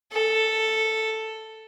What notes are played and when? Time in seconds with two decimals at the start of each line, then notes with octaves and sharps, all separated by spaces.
0.12 A4